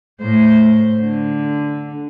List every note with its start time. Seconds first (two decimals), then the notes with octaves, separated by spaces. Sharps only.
0.21 A2 C5
1.00 D3